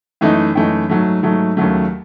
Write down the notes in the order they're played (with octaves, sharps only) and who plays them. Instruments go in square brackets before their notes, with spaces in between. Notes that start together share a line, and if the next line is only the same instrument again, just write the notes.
[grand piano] F#2 E3 A3 D#4
F#2 E3 A3 D#4
G#2 F#3 A3
G#2 F#3 A3
D#2 C#3 F#3 A3